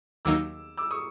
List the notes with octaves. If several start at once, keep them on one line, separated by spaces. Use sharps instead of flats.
D#2 D#3 F#3 A#3 D#4 D6 E6
D6 E6
C#6 D#6